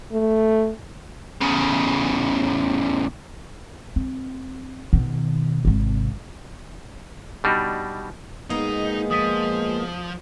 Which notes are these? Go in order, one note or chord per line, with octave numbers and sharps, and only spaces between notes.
A3
E2 C#3
C4
B2 D#3
G#1 C3
B2 G3 D4 D#4
A#2 G#3 A#3 B3 D#4 D#6
F3 D#6 B6 D#7